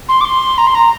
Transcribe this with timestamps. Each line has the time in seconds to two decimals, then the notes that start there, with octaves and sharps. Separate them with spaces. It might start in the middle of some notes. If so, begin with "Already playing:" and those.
0.09 C6
0.21 D6
0.25 C6
0.58 A#5
0.67 C6
0.75 A#5